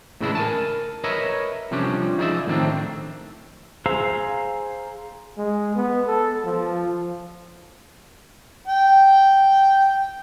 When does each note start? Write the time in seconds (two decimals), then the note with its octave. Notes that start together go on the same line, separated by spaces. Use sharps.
0.20 A2 C#3 E3 G#3 D4 E4
0.35 A#4 G#5 A5
1.04 A#4 B4 C#5 D#5 E5
1.71 C3 F3 G3 C#4 D4
2.18 F3 D#4 G#4 D5 E5
2.47 A2 D3 D#3 G3 C4 D4
3.86 G#4 C5 F5 A#5 E6
5.38 G#3
5.75 B3
6.07 A4
6.45 F3
8.67 G5